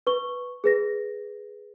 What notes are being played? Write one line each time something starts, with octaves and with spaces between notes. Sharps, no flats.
B4 C#6 G7
G#4 B4 A#6